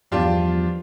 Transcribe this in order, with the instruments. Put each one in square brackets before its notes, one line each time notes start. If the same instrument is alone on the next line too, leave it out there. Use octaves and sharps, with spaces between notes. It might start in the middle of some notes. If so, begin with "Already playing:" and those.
[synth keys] E2 G2 [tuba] F3 [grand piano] D4 F4 G4